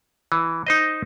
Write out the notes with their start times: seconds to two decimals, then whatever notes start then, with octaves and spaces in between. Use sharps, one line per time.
0.32 E3
0.67 D#4 C5 D#5